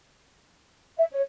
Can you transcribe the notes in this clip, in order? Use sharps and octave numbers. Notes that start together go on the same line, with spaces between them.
E5
C#5